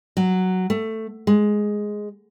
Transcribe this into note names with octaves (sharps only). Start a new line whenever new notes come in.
F#3
A3
G#3